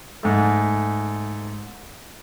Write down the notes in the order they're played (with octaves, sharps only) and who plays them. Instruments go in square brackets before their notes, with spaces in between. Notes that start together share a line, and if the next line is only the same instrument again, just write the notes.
[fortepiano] G#2 A3